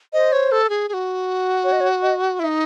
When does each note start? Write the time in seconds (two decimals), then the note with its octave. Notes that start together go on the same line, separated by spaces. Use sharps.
0.13 C5 D#5
0.32 C#5
0.52 A4
0.69 G#4
0.89 G#4
0.93 F#4
1.64 C#5
1.72 D#5
1.81 C#5
2.02 D#5
2.39 E4 E5
2.44 D#4